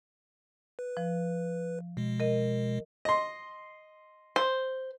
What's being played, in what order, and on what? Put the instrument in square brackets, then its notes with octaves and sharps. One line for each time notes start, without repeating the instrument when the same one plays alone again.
[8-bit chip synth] B4
[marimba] F3
[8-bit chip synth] B2 G#3
[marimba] A#4 D#5
[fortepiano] D#5 C6
[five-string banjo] C5